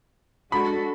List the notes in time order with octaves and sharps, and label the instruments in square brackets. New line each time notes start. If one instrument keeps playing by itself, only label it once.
[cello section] G#3 D4 F#4 A4 [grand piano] B5